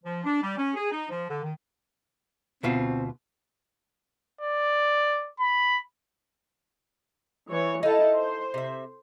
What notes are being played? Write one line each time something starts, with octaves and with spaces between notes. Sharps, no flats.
F3
D4
G3
C#4
G#4
D#4
F3
D3
D#3
D2 B2 C4 F4
D5
B5
E3 C#5
D#4 E4 A4 F5 A5
C5
C3 E5